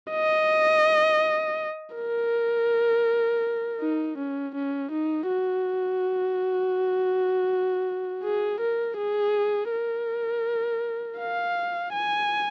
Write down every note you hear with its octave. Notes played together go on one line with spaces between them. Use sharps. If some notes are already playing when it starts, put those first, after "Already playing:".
D#5
A#4
D#4
C#4
C#4
D#4
F#4
G#4
A#4
G#4
A#4
F5
G#5